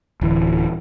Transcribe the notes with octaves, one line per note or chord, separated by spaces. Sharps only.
D1 E3